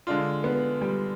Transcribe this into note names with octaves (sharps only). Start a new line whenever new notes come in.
D3 G#3 D4 F4
B3
G3